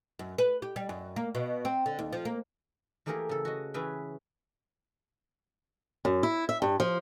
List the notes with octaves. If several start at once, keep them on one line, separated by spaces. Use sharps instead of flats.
F#2
B4
G4
G3
F#2
A#3
B2
C4
D3
D#2
F3
A#3
E3 A3 A#3 G4 G#4 A#4
C#3 A4
F#4 D#5
E3 C#4 G#4 B4 E5 G5
F#2
E4
E5
G2
F3